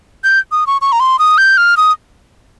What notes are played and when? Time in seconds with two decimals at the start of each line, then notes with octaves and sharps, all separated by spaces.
0.24 G6
0.52 D#6
0.67 C#6
0.81 C#6
0.92 A#5
1.00 C6
1.19 D#6
1.38 G6
1.57 F6
1.77 D#6